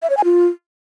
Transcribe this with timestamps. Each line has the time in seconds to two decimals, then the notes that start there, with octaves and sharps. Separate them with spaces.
0.03 E5
0.10 C#5
0.17 G#5
0.24 F4